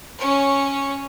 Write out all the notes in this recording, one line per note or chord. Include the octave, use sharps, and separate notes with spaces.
C#4 C#5